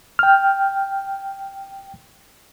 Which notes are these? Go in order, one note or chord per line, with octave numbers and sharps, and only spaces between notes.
G5 F6